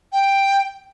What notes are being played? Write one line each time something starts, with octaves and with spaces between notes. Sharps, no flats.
G5